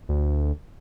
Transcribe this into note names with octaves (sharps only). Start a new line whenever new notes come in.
D2